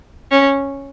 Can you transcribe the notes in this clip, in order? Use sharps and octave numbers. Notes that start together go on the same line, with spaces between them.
C#4